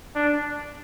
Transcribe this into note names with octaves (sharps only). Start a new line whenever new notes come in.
D4